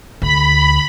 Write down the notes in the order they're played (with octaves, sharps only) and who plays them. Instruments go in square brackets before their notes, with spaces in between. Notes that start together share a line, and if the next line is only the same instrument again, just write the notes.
[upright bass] D2 [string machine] B5